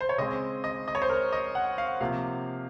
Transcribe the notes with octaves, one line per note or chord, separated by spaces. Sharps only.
C5
C#5
C#3 G#3 C4 D#5
D#5
D#5
C#5
C5
A#4
D#5
F#5
F5
C3 F3 A#3 F5